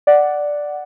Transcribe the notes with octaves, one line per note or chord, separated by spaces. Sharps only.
D5 F#5